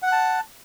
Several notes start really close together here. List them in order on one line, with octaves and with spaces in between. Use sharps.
F#5 F#6 A5